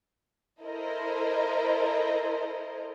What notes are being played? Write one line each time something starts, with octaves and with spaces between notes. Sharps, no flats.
E4 A4 A#4 C5 D#5